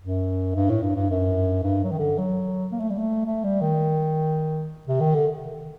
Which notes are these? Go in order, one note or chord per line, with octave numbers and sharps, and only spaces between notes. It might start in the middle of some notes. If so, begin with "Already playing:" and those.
F#2
G2
A2
G2
G2
F#2
G2
F#3
D#3
D3
F#3
A#3
A3
G3
A3
A3
G3
D#3
C3
D#3
D3